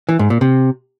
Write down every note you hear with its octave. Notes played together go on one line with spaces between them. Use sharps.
E3
G#2
A#2
C3